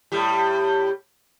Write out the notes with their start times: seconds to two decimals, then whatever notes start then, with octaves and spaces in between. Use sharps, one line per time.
0.12 A2 G3